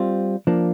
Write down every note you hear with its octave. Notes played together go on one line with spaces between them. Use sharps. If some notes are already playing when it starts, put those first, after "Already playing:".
Already playing: G3 C4 F4
F3 A#3 D4